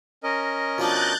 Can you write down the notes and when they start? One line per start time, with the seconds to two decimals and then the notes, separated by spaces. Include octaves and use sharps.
0.23 C#4 A#4 D#5
0.78 B2 F3 D4 F#6 G6 A6